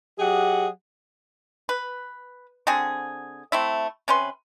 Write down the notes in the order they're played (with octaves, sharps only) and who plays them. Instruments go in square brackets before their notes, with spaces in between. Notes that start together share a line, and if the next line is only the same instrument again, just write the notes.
[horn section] F#3 G4 G#4 D#5 F#5
[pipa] B4
D3 C4 F#4 G#4
A3 C4 E4 E5
C3 C#4 B4 C6